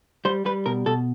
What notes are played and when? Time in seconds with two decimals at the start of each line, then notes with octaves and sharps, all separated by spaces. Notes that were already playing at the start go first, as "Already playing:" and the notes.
0.25 G3 C5
0.46 G3 B4
0.66 B2 A#4
0.86 B2 A4